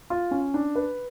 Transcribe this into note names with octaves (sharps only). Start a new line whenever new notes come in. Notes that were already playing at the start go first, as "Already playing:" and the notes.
F4
C#4
D4
B4